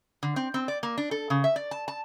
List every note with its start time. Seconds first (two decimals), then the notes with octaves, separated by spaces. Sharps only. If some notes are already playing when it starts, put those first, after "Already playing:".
0.23 D3
0.36 C4
0.54 C4
0.68 D5
0.83 A#3
0.98 D4
1.11 A4
1.30 C#3
1.44 E5
1.56 D5
1.71 A5
1.88 A5